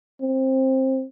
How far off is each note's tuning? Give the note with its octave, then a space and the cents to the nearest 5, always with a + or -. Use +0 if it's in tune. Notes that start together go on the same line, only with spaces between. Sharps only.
C4 +15